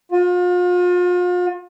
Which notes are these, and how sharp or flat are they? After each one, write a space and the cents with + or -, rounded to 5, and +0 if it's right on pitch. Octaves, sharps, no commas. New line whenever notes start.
F4 +40